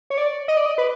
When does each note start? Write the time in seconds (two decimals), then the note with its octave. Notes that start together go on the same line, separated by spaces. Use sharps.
0.10 C#5
0.18 D5
0.48 D#5
0.57 D5
0.66 D#5
0.78 B4